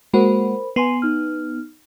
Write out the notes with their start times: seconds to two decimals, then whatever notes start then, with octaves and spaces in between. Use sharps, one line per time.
0.13 G#3 A#3 F#4 A#4 C5 B5
0.76 B3 G#5 C6 C7
1.02 D#4 F6